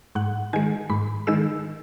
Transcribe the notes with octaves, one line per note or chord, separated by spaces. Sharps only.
G#2 F#5
D#3 G#3 G#5
G#2 B5
D#3 G#3 E6